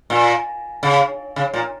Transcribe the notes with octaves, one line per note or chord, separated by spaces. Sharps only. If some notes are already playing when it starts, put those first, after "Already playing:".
A#2
C#3
C#3
A#2